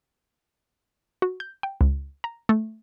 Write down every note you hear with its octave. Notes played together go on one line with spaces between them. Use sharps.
F#4
G6
G5
C#2
A#5
A3